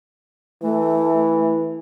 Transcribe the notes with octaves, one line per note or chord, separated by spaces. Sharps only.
E3 A3